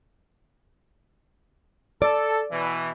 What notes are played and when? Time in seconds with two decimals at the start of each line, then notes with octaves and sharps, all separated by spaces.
2.02 A4 D5
2.52 B2 E3